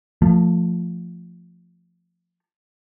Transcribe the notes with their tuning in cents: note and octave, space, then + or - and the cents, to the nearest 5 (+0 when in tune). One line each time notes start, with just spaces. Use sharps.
F3 +0 A3 +20